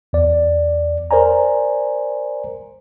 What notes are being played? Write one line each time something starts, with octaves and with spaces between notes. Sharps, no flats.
E2 D5
A#4 C5 D5 G#5 A#5